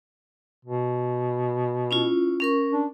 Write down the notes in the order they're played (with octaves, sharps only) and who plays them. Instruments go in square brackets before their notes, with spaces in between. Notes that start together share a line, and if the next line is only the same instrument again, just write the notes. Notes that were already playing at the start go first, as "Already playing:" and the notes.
[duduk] B2
[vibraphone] C#4 E4 F4
C#4 A#4 C#6
[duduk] D4